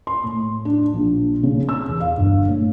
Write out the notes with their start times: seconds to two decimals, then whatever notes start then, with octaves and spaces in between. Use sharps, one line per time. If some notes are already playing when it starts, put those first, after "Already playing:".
0.07 C6
0.23 A2
0.65 D4
0.94 A#1
1.43 C#3
1.69 E6
1.89 E2
2.00 F5
2.18 G1
2.48 A2